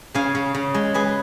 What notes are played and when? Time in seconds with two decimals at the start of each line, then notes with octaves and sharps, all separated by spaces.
0.15 C#3 F5 G#5
0.35 C#3
0.55 C#3
0.74 G#3
0.94 G#3 G#4 B4